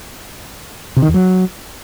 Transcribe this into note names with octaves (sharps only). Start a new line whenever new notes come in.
C3
D#3
E2
F#3